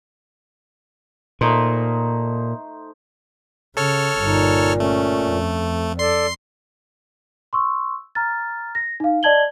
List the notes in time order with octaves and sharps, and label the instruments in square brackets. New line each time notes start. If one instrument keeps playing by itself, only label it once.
[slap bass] A#2 [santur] A3 D#4 C5
[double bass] C#3 [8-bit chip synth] A4 C#5 F6
[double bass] G1 D#4 [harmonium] A#2
[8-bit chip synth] A3 [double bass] C#4
[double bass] F2
[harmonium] A4 D5 [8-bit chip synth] C6 C7
[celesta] C6 C#6 E6
A#5 F6 A6
A#6
D#4 F5
D5 D#5 A5 G#6 F#7 G7